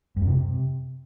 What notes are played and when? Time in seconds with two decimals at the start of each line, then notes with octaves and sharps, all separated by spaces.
0.16 G2
0.22 F#2
0.27 C3